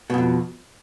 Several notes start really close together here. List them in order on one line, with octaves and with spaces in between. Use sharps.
B2 G#2 F2